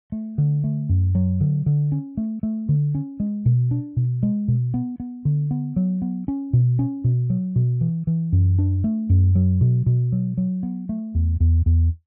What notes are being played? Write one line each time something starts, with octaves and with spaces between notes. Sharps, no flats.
A3
D3
A3
F#2
F#3
D3
D3
C#4
A3
A3
D3
C#4
G#3
B2
D4
B2
G#3
B2
B3
B3
D3
B3
F#3
B3
C#4
B2
C#4
B2
F#3
B2
E3
E3
F#2
D4
A3
F#2
F#3
B2
B2
F#3
F#3
B3
A3
E2
E2
E2